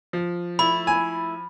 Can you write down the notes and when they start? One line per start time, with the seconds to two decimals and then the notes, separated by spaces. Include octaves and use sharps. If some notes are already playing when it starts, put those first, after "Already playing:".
0.13 F3
0.59 A3 E4 B5
0.87 G#5